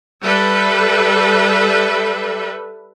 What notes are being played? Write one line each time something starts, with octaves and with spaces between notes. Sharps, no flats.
G3 A4 B4 E5